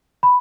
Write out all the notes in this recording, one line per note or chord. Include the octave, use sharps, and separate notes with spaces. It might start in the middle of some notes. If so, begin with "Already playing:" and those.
B5